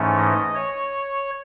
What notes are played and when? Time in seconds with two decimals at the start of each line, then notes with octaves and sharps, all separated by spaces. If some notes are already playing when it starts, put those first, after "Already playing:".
Already playing: G#2 E3 A3 C#4
0.19 D#5
0.55 C#5